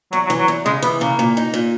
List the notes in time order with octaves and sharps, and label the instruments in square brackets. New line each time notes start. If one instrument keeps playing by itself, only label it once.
[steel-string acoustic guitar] E2 [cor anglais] F#3
[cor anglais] F#3
[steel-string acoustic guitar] E3
[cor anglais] F#3
[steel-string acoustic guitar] E2
[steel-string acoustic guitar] C#3 [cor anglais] G#3
[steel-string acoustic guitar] E3 [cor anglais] B3
[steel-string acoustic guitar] C#3 [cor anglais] A#3
[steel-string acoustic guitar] A#2
D#4
A#2